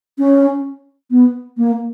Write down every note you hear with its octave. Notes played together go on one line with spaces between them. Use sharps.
C#4
B3
A#3